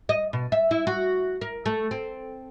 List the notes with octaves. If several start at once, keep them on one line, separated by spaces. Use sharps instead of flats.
D#5
B2
E5
E4
F#4
A#4
A3
C4